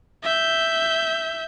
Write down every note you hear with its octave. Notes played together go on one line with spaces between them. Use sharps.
E5 G6